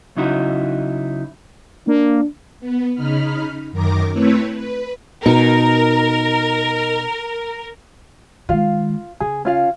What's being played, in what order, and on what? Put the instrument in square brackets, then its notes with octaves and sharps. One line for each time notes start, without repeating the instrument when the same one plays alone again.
[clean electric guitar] C#3 F#3 D#4 E4 F#4
[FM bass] A#3 [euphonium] D4
[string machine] B3
C#3 D#4 B5 F6
F#2 D#3 A#4 A#5 D6
A3 C4 E4 B4 C#5
B4
[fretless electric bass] B2 [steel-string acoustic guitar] D#4 [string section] A#4
[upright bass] D#3 G#3 [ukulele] F4 F5
[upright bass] C#3 [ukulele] G#4
[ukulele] C#4 F4 F5